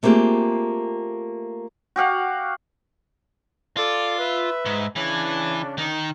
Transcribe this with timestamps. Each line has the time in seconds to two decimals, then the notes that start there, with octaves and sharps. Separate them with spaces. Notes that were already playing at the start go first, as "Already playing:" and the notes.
0.03 A3 A#3 C4 F4 G4 G#4
1.96 F#4 G4 F5 F#5
3.77 F4 A4 D5
4.19 B4 E5
4.66 G#2
4.96 C#3 E3 C#4 D4
5.78 D#3